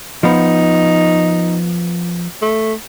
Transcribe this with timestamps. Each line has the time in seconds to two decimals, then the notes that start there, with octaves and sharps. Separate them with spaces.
0.23 F3 B3 D#4
2.42 A3